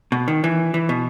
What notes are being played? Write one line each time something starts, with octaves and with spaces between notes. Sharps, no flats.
B2
D#3
E3
E3
B2